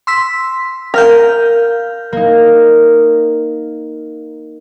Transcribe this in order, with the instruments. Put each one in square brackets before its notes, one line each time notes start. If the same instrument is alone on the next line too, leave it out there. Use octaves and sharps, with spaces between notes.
[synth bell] C6 E6 B6
[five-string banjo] A#4 [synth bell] F5 F6 G6
[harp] A#3 D#4